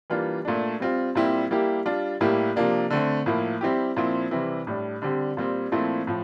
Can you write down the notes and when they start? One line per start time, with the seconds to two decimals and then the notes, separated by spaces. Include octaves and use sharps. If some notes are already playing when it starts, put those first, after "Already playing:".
0.10 E3 G3 A#3 D4 F4
0.45 A#2 A3 D4
0.80 G3 C4 F4
1.15 A#2 G3 C4 E4 G4
1.51 G3 A#3 E4 G4
1.86 G3 D4 F4
2.21 A2 G3 A#3 E4 G4
2.56 C3 F3 A#3 D4
2.90 D3 A3 C4
3.26 A2 F3 A#3 E4
3.61 G3 C4 E4 G4
3.97 A#2 F3 C4 E4
4.31 C3 E3 G3 C4 E4
4.67 A2 G3 D4
5.02 D3 G3 C4 G4
5.37 A#2 G3 C4
5.72 A#2 F3 A3 C4 E4
6.07 A2 F3